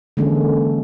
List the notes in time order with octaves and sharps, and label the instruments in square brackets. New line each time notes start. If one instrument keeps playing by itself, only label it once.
[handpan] D3 E3 G#3 A#3 C#4 A4